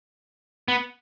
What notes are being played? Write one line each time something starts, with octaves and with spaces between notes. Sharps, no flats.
B3